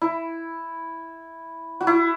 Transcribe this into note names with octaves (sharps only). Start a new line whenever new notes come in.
E4
F#4
E4